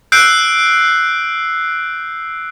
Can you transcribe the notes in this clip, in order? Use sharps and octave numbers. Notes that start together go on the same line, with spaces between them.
E6 F#6 G6 C7 D7